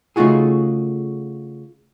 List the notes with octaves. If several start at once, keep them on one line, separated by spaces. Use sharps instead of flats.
C#3 A3 D#4 F4 F#4 G#4